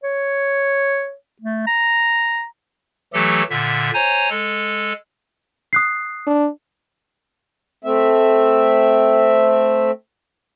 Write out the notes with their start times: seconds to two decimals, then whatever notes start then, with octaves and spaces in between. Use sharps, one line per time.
0.04 C#5
1.42 A3
1.67 A#5
3.13 E3 F#3 A3 G4 A4
3.50 A#2 D3 E5
3.94 C5 C#5 G#5 A#5
4.30 G#3 A4
5.73 D#6 F#6 C7
6.27 D4
7.84 A3 C4 E5